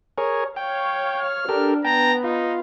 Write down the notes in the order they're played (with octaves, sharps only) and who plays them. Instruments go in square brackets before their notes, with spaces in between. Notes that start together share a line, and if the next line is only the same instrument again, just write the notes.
[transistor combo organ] G#4 A#4 C#5
[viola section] C#5 F5 [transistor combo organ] G5
[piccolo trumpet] F6
[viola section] D4 [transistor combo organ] G4 A4 A#4
[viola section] B3 [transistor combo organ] G5 A5 [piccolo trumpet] A#5
[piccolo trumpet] D#4 [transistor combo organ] F4